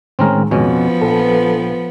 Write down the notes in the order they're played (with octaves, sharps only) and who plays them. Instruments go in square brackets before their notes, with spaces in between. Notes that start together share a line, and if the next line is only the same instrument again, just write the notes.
[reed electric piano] A2 D#3 G#3 [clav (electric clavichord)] C4 C#4 A#4
[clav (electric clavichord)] F2 B2 C#4 [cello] F3 B3
[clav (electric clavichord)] A#1 [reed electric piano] A4 B4